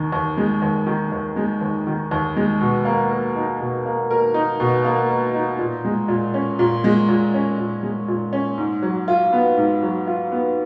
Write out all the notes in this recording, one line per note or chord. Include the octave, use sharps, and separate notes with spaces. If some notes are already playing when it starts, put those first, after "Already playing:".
Already playing: D#2 D#3
D#2
G#3
D#2
D#3
D#2
G#3
D#2
D#3
D#2
G#3
B2
A#3
A#4
D#4
B2
A#3
A#4
D#4
B2
A#3
A#4
D#4
A#2
G#3
A#2
C#4
A#2
G#3
A#2
C#4
A#2
G#3
A#2
C#4
G#2
F#3
F4
B3
G#2
F#3
F4
B3